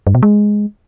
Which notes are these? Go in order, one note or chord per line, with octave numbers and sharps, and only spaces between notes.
G2
B2
G#3